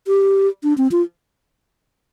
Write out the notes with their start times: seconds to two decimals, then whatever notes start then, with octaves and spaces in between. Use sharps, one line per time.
0.08 G4
0.64 D4
0.78 C4
0.92 F4